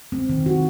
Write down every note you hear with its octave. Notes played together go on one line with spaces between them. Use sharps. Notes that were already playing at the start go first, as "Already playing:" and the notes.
C4
D#3
F#4